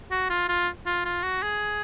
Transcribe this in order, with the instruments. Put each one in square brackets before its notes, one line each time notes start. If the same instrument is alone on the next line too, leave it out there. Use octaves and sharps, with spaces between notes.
[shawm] F#4
F4
F4
F4
F4
F#4
G#4